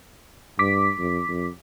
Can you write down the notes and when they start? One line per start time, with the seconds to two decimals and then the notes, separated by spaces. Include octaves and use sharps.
0.59 G2 D6 B6
0.99 F2
1.29 F2